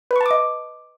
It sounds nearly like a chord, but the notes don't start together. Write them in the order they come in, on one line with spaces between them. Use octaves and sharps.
B4 C#6 A5 D6 D#5